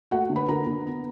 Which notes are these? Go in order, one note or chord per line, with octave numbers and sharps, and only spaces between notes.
A3 F#4 F#5
D3
B4 B5
D3 A#4 A#5
D3
B3